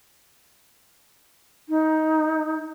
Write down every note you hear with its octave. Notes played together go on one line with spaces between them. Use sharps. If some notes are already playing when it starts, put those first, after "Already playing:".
D#4